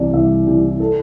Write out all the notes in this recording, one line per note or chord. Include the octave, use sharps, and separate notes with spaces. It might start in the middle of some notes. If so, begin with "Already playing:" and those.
Already playing: C2 C3 E3 D5
C2 E5
C3 E3 G4
A4